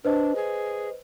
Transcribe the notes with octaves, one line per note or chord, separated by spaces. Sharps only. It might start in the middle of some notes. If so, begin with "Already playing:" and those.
D4 B4 C5 D#5
G#4